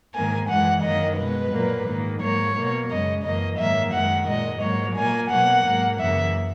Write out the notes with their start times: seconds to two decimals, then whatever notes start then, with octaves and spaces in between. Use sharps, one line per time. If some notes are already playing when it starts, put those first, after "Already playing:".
0.14 G#2 D#3 A#3 G#5
0.49 F#2 E3 G#3 F#5
0.83 F#2 D#3 F#3 A#3 D#5
1.17 B2 G#3 B4
1.52 A#2 F#3 A#3
1.87 G#2 D#3 A#3
2.20 G#2 F#3 A#3 C#5
2.55 B2 A#3
2.90 F#2 C#3 G#3 D#5
3.24 F#2 E3 A#3 D#5
3.58 G#2 D#3 F#3 A#3 E5
3.93 F#2 D#3 G#3 F#5
4.27 A#2 G#3 D#5
4.61 G#2 F#3 A#3 C#5
4.95 A#2 A#3 G#5
5.30 B2 F#3 A#3 F#5
5.65 G#2 F#3 A#3
5.99 F#2 C#3 E3 A#3 E5